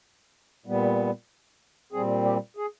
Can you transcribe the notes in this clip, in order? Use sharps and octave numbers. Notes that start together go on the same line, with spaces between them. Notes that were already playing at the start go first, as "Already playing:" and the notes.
A#2 G3 B3
A#2 G3 C4 G#4
G4
G#4